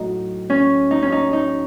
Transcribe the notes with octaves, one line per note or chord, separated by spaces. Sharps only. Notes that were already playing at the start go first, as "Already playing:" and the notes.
Already playing: A2 F#3 D#4 F#4
C#4
D#4
C#4
D#4
D#4